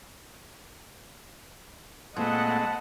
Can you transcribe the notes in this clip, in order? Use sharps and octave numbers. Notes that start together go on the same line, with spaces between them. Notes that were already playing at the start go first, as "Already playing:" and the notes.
A#2 G#3 A3 C4 B4 D#5 F#5 A5